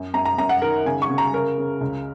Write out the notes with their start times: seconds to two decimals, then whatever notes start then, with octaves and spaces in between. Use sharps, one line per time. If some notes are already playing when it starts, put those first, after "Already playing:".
Already playing: F#2
0.14 F#2 A#5
0.25 A#5
0.38 F#2 A#5
0.49 F#5
0.62 D#3 A#4
0.86 C#3 G#5
1.02 C#6
1.09 C#3
1.18 A#5
1.34 C#3 A#4
1.58 C#3
1.81 C#2